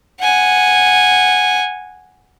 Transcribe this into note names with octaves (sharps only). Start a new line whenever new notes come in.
F#5 G#5